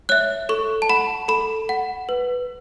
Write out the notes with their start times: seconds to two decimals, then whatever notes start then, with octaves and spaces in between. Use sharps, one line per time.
0.09 C#5 E5 F#6
0.49 A4 C#6
0.82 A5
0.90 F#5 B5
1.28 A4 B5
1.69 F#5
2.09 B4